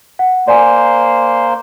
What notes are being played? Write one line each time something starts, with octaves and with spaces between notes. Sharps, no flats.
F#5
A#3 C5 D5 G#5